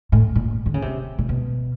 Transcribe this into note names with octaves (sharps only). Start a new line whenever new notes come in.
A2
A#2
D3
C#3
C3
A#2
B2